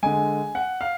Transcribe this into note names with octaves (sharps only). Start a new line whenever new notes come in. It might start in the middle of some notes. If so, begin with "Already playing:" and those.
D3 G#3 G#5
F#5
F5